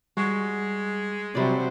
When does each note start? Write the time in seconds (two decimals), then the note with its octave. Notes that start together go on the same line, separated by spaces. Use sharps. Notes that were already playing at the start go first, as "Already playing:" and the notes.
0.17 G3 G#3 F#4
1.35 C3 F#3 G3 C5 D5